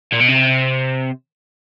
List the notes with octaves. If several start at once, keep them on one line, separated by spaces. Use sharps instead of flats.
A#2
B2
C3